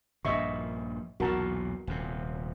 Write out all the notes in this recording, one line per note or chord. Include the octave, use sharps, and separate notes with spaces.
A#1 G2 A#2 D#5 E5 C#6
B1 E2 A#2 F#4 A#4 A5
D#1 F2 C3